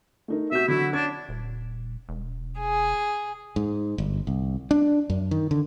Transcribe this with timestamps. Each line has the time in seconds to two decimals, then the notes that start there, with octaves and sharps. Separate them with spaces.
0.28 A3 D#4 A#4
0.51 C3 B3 F#4 E5 G6
0.68 D3 F#3 E4
0.93 C#4 D4 G#6
1.29 D#1
2.09 E1
2.60 G#4
3.56 G#2
3.98 G1
4.27 C2
4.71 D4
5.10 F#2
5.31 D#3
5.51 D3